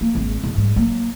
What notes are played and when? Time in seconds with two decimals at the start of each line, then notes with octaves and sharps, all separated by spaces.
0.01 A#3
0.15 G#1 E2
0.43 E1
0.55 G#2 G3
0.76 F#3 A#3